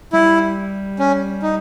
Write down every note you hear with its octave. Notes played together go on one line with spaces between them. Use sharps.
G3 E4
C#4
D#4